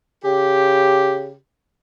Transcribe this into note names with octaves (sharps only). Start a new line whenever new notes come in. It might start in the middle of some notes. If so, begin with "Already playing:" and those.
C#3 G4